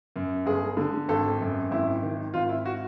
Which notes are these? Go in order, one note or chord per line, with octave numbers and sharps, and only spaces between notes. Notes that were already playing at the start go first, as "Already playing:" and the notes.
F#2
G1 G#4
D3
G#1 A4
F#2
G#1 E4
D#3
G#1 F4
E4
F#4